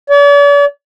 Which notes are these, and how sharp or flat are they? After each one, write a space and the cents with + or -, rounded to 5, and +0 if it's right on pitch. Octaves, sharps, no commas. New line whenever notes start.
D5 -45